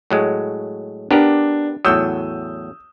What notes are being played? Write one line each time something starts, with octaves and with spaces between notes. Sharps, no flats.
A2 F#3 G#3
B3 D4 G4 A#4
E2 A2 F#3 D#6 E6 G6